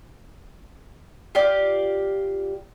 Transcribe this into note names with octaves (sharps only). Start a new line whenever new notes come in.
F4 G4 D5